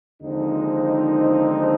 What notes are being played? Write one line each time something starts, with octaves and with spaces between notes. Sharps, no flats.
D#2 D3 F3 G#3 C4 D#4